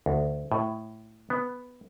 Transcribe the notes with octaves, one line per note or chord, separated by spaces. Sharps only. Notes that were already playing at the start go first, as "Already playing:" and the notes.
D2
A2
B3